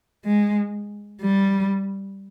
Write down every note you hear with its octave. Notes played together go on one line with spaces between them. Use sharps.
G#3
G3